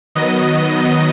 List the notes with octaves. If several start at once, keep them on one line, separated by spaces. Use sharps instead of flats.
D#3 F#3 B3 D#5